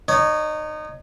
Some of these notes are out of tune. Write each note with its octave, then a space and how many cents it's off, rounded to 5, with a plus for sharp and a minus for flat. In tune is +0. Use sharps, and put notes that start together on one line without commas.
D#4 -25 C#5 +10